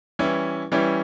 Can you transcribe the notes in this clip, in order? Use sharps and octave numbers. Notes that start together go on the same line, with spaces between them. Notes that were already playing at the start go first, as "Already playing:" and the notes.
E3 G3 C#4 E4
E3 G3 C#4 E4